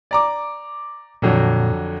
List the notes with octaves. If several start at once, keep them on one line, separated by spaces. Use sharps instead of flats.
D5 A#5 D6
F2 A#2 D3 F#3